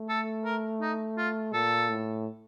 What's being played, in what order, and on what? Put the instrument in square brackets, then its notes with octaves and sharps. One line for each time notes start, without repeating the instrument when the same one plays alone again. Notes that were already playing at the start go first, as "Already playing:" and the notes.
Already playing: [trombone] A3
[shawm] A4
A#4
D#4
F4
[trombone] A#2 [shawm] A4
[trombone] A2